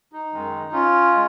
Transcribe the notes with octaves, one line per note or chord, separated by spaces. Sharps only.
D#4
F#2 D#3 G#3
C#4 F4
G#3